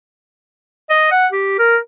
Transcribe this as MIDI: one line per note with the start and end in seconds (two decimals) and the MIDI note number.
0.90 1.07 75
1.11 1.27 78
1.32 1.54 67
1.59 1.77 70